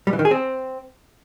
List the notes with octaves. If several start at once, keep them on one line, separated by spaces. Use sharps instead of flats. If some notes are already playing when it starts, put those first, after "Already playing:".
G3
E3
D#3
G#4
C4